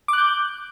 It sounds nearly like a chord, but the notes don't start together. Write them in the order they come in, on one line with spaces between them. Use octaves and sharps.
D6 F#6 G6